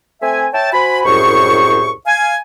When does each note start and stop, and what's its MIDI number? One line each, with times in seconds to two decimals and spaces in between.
0.22 0.47 57
0.22 0.47 60
0.22 0.47 76
0.22 0.47 80
0.53 0.71 73
0.53 0.71 76
0.53 0.71 79
0.53 0.71 81
0.73 1.03 66
0.73 1.03 72
0.73 1.03 80
0.73 1.03 83
1.05 1.92 36
1.05 1.92 42
1.05 1.92 45
1.05 1.92 68
1.05 1.92 72
1.05 1.92 85
2.06 2.36 77
2.06 2.36 80